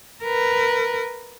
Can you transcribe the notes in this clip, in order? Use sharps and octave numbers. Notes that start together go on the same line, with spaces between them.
A#4 B4